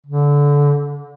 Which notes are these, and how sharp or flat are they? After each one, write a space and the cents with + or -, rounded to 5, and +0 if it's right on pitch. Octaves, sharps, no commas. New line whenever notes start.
D3 -25